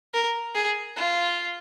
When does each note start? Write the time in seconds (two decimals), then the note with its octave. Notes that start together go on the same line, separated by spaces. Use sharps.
0.14 A#4
0.55 G#4
0.96 F4